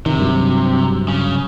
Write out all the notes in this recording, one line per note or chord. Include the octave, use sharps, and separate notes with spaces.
C3 D#3
G2 F#3
C#3